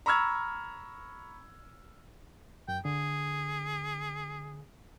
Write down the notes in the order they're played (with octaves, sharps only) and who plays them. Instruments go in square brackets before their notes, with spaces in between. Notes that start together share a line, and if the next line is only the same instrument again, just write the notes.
[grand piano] A#5 B5 C#6 E6 F6 G#6
[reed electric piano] F#2 [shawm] G5
[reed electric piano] D3 [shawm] G#4